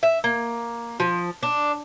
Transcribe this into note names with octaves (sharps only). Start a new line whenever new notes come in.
E5
A#3
F3
D4